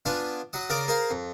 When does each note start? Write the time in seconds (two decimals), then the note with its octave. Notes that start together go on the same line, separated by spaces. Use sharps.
0.06 B3 D4 F4 F5 G#5
0.53 F#3 F#5 D#6
0.69 C#3 A#4 D5 F5 D6 D#6
0.88 G#4 A#4 C5 F5
1.10 F2